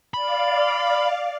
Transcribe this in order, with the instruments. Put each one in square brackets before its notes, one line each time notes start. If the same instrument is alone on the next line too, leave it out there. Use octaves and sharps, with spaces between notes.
[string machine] D5 F5 [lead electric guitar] B5